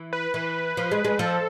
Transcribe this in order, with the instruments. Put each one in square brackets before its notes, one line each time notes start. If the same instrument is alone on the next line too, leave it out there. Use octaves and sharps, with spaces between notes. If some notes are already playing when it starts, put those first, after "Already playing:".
Already playing: [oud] E3
[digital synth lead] B4
[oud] E3
F3
G#3
G#3
[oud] F3 [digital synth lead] A4